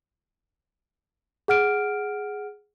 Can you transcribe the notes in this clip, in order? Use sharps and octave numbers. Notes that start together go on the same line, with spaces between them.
G#4 F#5 F6 D7